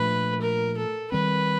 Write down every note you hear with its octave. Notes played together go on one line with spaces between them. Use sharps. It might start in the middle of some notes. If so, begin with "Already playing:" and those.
Already playing: A#2 F3 A3 D4 B4
A#4
A4
D#3 G3 C4 B4